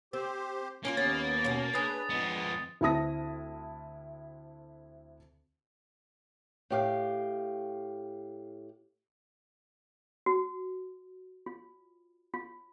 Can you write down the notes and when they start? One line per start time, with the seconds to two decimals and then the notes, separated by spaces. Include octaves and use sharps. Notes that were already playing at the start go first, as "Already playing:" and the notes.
0.13 C4 G4 C5
0.85 A#3 C#4 D#4 F4
0.97 D#2 B3 C#4 A6
1.45 B2 C#4
1.74 D4 G#4 B4 D#6 A6
2.10 F2 G#3 B3
2.81 D2 C4 E4 A5 D#6 A#6
6.70 A2 G4 F5
10.26 F#4
11.46 F4
12.34 F4